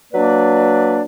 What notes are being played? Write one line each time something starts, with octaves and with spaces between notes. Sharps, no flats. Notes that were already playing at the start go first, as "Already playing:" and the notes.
F#3 A#3 D4 B4 D5